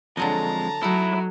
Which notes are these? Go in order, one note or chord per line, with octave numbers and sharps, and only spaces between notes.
F2 D3 F#3 G#3 D#5 A5 A#5
F#3 A3 D#4 E4